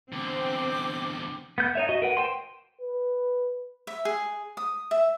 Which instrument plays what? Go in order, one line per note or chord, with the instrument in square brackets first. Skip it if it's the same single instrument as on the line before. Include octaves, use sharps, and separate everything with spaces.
[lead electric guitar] E2 D3 [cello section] C4 [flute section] G5 D6
[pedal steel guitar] B3 G6
D#4 C#5 E5
F#4 D#5 E5
A#4 B4 F#5
C5 G5 C6
[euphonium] B4
[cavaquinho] E5
G#4
D#6
E5